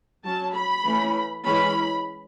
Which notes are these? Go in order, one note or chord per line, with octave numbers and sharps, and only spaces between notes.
F#3 C#4 A5
B5
E3 A3 C#4
E3 G#3 C#4 B5